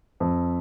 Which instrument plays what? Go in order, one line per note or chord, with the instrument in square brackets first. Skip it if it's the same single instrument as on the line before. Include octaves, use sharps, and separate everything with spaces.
[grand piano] F2